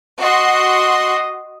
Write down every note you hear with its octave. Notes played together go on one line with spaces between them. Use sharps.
F#4 D#5 C6